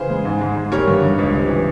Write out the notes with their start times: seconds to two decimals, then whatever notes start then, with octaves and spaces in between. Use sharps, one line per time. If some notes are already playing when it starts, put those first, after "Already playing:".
Already playing: C#3 E3 G#4 C5
0.10 G#3
0.25 G#2
0.41 G#2
0.56 G#2
0.72 G3 A#4 C#5
0.88 G2
1.02 G2
1.19 C#2
1.33 C3
1.49 E3